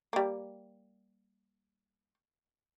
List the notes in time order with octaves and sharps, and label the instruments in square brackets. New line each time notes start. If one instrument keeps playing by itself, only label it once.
[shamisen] G3 A#3